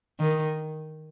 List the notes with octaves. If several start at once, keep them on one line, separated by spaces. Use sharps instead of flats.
D#3